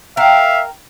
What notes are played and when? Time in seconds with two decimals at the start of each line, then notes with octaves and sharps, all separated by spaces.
0.17 A#4 E5 F5 G5